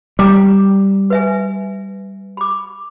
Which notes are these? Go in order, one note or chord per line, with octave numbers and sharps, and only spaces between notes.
G3 G5 A#5 D6
B4 E5 G#5
B5 D6